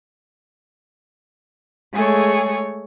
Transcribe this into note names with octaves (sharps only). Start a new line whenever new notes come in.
G#3 A3 G#4 C#5